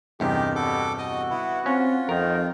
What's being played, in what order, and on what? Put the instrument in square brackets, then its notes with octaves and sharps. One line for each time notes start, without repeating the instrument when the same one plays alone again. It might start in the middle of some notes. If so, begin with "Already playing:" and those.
[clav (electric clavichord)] E2 G2 C3 [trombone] D#3 [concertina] G4
[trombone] B2 [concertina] A4 D6
[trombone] F#4 [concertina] D#5
[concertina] B3 E4
[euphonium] C4 [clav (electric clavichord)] C#4 [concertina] F4
[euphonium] F2 [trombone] D#3 [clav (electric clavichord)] A#4